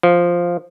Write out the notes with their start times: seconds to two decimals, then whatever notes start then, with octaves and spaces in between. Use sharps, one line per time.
0.03 F3